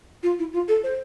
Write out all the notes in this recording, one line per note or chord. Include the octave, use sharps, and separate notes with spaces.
F4
E4
F4
A4
C5